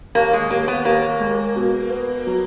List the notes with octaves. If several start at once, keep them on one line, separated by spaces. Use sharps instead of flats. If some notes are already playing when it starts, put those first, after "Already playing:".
D#2 A#3
G#3
D#2 A#3
B3
D#2 A#3
G#3
B2
B3
F#3